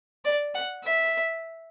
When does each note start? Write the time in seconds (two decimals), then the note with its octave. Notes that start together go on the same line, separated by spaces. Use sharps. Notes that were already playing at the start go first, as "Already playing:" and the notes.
0.25 D5
0.55 F#5
0.84 E5